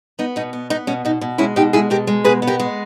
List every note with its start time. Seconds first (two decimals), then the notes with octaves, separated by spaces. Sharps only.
0.19 B3 D#4
0.36 B2 D#4
0.53 B3
0.70 B3 D#4
0.87 B2 C#4
1.05 B2 D#4
1.21 B2
1.38 G#3 C#4 E4
1.56 B2 D#4 G4
1.73 G#3 E4 G#4
1.90 B2 G4 A#4
2.07 G#3
2.24 B2 G#4 B4
2.42 B3
2.47 G4 A#4
2.60 G#3